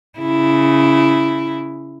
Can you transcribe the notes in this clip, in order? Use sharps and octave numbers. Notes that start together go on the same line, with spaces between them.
C#3 E4